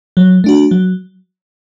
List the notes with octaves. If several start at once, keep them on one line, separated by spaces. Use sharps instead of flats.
F#3
A3 D4 F#4
F#3